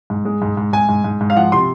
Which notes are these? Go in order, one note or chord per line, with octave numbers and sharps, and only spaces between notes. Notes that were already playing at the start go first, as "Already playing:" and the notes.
G#2
G#3
G#2
G#2
G#2 G#5
G#2
G#2
G#2
F5
F3 F#5
C3 C6